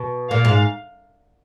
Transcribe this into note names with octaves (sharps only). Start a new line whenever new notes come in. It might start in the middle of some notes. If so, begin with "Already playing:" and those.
Already playing: B2
A#2 F5
G#2